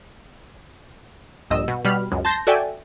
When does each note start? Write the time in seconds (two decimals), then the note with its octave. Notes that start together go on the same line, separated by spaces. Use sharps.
1.50 A#1 G2 D#5 E6
1.68 B2
1.85 B2 G3 B5 F6
2.12 C#2 F#2
2.25 A5 C6 G6 A#6
2.47 F#4 A4 D5 E5 G5 G#5